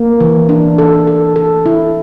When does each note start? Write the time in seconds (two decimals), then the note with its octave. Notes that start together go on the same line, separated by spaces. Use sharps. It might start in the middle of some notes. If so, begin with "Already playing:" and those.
Already playing: A#3
0.20 E3
0.49 D4
0.78 A4
1.07 A4
1.36 A4
1.66 E4